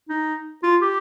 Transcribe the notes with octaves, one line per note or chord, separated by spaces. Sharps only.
D#4
F4
G4